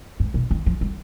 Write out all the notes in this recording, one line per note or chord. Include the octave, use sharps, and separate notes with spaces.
G#2
B2
D#3
F3
G3